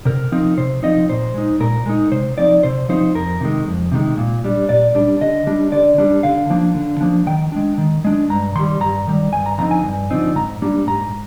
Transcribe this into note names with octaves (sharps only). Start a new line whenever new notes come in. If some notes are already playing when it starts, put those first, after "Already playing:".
C3 A#4
F3 C4 D#4
C3 C5
F3 C4 D#4 D#5
A#2 C5
G#3 D#4
A#2 A#4
G#3 D#4
C3 C5
F3 C4 D#4 D5
C3 C5
F3 C4 D#4 C5
F2 A#4
C3 D#3 G#3
F2
C3 D#3 G#3
A#2
G3 D4
A#2 D5
G3 D4
D3 D#5
G3 D4
D3 D5
G3 D4
D3 F5
F3 A#3 D4
D3
F3 A#3 D4
D#3 G5
G#3 D4
D#3
G#3 D4
G2 A#5
D#3 G3 C6
G2 A#5
D#3 G3
G2 G#5
A#5
D3 F3 C4 D#4 A#5
G#5
G2
D3 F3 C4 D#4
G#2 A#5
G3 A#3 D4
G#2 A#5